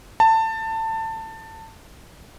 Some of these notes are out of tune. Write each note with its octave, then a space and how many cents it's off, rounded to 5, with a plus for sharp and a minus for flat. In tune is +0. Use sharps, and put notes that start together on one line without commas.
A5 +20